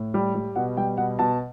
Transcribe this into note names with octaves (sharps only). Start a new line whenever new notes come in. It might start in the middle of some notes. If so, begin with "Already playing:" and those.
Already playing: A2
G3
G3
B2 F#5
G3 G5
B2 F#5
B2 A5